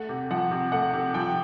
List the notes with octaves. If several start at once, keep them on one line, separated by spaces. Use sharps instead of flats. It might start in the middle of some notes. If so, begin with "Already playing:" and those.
Already playing: A3 F#5
C3
F3 F#5
C3
A3 F#5
C3
F3 G5